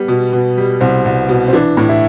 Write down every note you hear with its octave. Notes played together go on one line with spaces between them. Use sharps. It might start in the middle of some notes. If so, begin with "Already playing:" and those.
Already playing: G3 B3
B2
B2
G3
C2 C4
C2
B2
C4
E3 D4
A2
E4